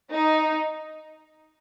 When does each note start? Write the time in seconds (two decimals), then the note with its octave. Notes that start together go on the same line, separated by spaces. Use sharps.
0.13 D#4